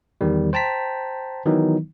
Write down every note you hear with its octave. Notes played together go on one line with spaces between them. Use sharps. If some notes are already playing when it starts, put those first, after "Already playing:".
E2 D#3 G3
C5 G5 A5 A#5 B6
D#3 E3 F#3 B3 D#4